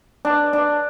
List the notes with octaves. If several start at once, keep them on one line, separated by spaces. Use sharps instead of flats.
D4
D4